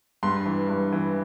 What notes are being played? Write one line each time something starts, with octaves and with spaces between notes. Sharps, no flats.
G2 C6
E3
G2
E3